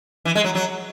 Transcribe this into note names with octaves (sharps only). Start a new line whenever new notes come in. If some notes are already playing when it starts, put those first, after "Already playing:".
E3
G#3
F#3
F#3